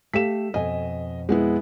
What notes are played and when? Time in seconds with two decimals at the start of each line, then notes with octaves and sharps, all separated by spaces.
0.14 A3 G4 F5 B6 E7
0.54 F2 B2 D#5 G#5
1.29 G#3 B3 E4